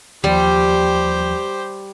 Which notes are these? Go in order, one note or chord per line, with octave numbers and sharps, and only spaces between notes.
D#2 F3 G3 G4 C5